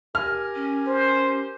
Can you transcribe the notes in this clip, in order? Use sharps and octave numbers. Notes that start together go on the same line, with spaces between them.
G4 A#4 G#5 F6
C#4
C5